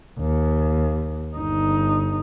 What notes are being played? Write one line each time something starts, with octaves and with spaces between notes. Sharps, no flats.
D#2
G1 D#4